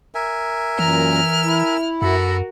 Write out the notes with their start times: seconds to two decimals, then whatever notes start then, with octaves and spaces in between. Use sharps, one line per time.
0.15 A#4 E5 G#5
0.79 F#2 A#2 E3 A#5 F6
1.44 E4
2.02 F#2 F#4 A4 A#4 B5